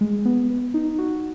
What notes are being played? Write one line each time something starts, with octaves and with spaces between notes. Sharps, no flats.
G#3
B3
B3
D#4
F#4